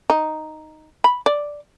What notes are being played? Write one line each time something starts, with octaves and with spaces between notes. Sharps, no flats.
D#4
B5
D5